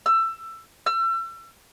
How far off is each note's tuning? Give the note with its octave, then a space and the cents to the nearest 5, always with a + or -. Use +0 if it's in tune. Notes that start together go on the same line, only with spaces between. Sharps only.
E6 +20
E6 +35